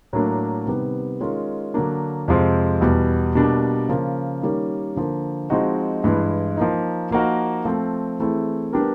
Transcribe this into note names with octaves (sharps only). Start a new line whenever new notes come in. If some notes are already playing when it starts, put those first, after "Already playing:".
A2 F#3 A#3 D4
C3 D#3 G3 B3
D#3 G#3 C#4 F4 A#4
D3 F#3 A#3 D4
F2 C3 F3 G#3 C4
E2 B2 G3
B2 G3 A#3 D4
C#3 F3 A#3
D#3 G3 A#3 C#4
D3 F3 A#3
F3 G#3 C4 D#4 F#4
G2 E3 G#3
F3 A#3 D#4
F3 A#3 D#4 F#4 A#4
F3 A3 C4
E3 A3 C4 E4 G#4
G3 B3 D4 G4 A#4